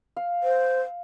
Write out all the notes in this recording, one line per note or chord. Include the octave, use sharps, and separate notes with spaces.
F5
C5